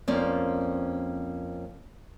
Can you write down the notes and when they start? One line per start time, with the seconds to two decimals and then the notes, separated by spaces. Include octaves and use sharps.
0.08 F2 A#3 C#4 C5 D5